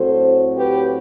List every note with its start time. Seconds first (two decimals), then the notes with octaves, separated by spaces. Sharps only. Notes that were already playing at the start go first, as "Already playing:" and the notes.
Already playing: A2 F#3 C4 A4 C5
0.56 G4 B4